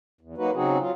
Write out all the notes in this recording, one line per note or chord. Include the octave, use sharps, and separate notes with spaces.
E2
F#3 A#3 D#4 F#4 B4
C#3 F#3 C4 D#4 F#4 G#4
F#3 F4